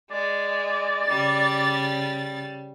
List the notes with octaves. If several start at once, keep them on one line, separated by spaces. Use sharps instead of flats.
G#3 D5
C#3 G3 A6